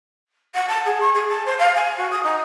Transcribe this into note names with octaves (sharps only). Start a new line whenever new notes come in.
F#5
A5
G#4
C#6
G#4
A5
C5
F5
G#5
F#4
D#6
D#4